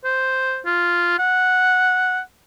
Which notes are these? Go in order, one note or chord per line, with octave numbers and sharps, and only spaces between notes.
C5
F4
F#5